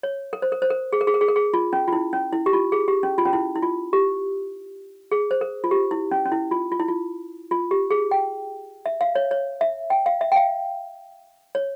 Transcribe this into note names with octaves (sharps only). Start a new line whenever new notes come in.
C#5
A#4
C5
A#4
C5
A#4
G#4
A#4
G#4
A#4
G#4
A#4
G#4
F4
C#4
F4
E4
C#4
E4
G4
F4
G#4
G4
C#4
F4
C#4
E4
E4
F4
G4
G#4
C5
A#4
F4
G4
E4
C#4
C#4
E4
F4
F4
E4
F4
F4
G4
G#4
G5
E5
F5
C#5
C#5
E5
G5
F5
E5
G5
F5
C#5